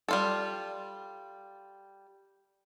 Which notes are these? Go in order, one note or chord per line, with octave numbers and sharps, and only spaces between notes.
G3 F4 A4